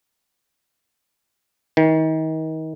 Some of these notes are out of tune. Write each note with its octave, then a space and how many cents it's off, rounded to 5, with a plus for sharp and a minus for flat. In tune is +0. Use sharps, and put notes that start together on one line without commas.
D#3 +35